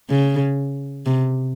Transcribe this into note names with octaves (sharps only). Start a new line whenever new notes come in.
C#3
C3